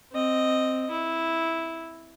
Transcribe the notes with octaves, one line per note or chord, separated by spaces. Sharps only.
C4 D#5
E4